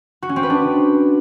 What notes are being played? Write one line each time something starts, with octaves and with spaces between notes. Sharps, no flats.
F#4
C#4
C4
B4
D4